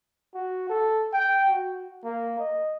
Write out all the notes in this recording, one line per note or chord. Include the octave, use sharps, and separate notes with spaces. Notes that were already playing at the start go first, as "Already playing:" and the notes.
F#4
A4
G5
F#4
A#3
D#5